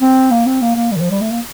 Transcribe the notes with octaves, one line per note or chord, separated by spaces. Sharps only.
C4
A#3
C4
A#3
A#3
G3
D#3
F3
G3
A3
A#3